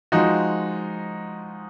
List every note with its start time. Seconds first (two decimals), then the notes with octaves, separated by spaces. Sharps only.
0.12 F3 G#3 D#4 F#4